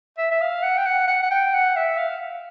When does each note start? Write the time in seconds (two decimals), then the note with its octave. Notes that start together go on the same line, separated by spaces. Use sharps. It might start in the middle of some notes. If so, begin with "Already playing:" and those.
0.18 E5
0.31 E5
0.41 F5
0.63 F#5
0.77 G5
0.85 F#5
1.08 F#5
1.22 F#5
1.31 G5
1.53 F#5
1.76 E5
1.97 F5